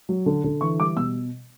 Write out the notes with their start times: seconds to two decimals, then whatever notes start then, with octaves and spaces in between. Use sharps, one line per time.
0.09 F#3
0.26 D3
0.44 D3
0.61 E3 C#6
0.79 G3 D6
0.96 B2 E6